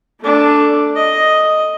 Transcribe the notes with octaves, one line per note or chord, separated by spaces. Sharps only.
A3 D4
D#5